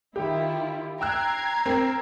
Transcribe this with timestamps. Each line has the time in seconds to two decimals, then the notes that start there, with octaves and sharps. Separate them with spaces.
0.16 D#3 E4 F4 G4
1.01 G5 A#5 E6 F#6 G#6 C7
1.66 C4 A#4